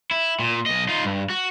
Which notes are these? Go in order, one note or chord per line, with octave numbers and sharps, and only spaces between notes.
E4
A#2
B1 D#5
D#4 F4
G2
F#4